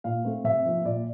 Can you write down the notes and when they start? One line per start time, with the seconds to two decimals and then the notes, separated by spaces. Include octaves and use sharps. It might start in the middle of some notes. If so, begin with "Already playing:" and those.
0.04 A#2 F5
0.25 A3 C4
0.44 C3 E5
0.65 F3 A#3
0.85 A#2 D5